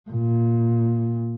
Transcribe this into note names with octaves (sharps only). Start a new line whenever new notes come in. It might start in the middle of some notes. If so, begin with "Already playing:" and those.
A#2